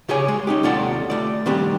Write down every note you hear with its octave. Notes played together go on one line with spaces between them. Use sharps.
C#3 G4 G#4 C#5 G#5
G#3
C#4 D#4 G4
D#2 C3 F4 A4 D5 F#5
A3 D5
D#3 G3 C4 D4 G4